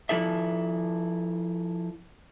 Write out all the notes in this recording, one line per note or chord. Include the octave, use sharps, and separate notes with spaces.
F3 E4 A4 E5